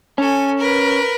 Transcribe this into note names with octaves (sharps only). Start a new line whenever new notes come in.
C#4 A4 G#5
A#4 B4